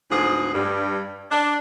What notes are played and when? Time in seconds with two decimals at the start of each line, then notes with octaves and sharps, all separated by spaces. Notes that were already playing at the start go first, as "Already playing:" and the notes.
0.10 D2 G#2 F3 B3 G#4
0.54 G2
1.31 D4